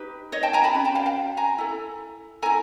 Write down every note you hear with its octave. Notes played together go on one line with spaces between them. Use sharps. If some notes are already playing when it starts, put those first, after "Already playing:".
Already playing: D#4 G4 B4
C#5 D#5
G5 A5
G#5 A#5
A5 B5
C#4 F#4
G5 A5
F5 G5
F5 G5
G#5 A#5
E4 A4
E4 A4 G#5 A#5